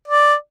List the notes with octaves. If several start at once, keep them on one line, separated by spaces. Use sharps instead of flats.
D5